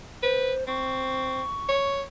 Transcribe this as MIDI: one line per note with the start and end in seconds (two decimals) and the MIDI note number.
0.23 0.53 71
0.23 0.64 72
0.68 1.43 60
0.68 1.93 85
1.69 2.02 73